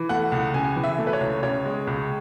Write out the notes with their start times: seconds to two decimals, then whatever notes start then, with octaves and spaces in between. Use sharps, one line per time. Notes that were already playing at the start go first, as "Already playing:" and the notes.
Already playing: E3
0.09 A3 F#5
0.32 C#2
0.54 C#3 G#5
0.76 E3
0.84 E5
0.98 A3
1.07 B4
1.13 C#5
1.20 C#2
1.43 C#3 C#5
1.65 G#3
1.87 C#2